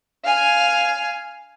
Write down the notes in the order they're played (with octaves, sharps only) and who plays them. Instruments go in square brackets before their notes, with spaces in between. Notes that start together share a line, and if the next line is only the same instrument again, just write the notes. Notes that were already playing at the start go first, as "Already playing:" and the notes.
[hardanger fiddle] F5 G#5